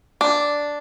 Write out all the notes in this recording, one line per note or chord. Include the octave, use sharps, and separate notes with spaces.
D4